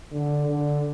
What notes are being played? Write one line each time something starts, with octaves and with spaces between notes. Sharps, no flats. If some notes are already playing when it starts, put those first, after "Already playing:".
D3
D3